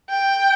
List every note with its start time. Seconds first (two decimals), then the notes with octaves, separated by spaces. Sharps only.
0.10 G5